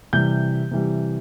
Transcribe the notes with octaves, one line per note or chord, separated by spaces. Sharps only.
C3 E3 G3 G6
C3 E3 G3